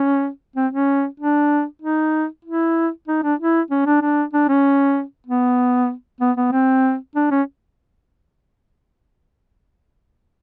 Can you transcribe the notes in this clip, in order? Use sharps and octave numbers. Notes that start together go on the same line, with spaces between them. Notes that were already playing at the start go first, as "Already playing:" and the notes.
Already playing: C#4
C4
C#4
D4
D#4
E4
D#4
D4
E4
C#4
D4
D4
D4
C#4
B3
B3
B3
C4
D4
C#4